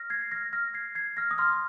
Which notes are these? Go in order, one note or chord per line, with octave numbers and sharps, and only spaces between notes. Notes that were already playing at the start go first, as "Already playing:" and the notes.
Already playing: F6 A#6
G#6 C7
C7
F6 A#6
F6 A#6
G#6 C7
G#6 C7
F6 A#6
D#6
C6 F6